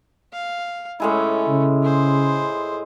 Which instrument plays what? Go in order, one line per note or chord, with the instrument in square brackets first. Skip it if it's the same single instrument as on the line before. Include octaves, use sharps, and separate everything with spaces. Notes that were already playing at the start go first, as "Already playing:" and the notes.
[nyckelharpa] F5
[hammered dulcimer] A2 G#3 E4 [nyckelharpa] A3 C#4
[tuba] C#3
[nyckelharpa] G#4 C5